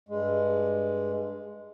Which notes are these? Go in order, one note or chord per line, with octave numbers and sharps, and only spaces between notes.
G2 G#3